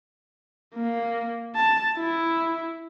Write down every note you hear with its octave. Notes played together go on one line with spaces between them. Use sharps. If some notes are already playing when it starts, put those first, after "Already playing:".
A#3
A5
E4